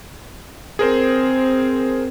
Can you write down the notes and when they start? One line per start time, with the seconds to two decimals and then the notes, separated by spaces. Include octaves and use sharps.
0.79 C4 G#4 A#4 C5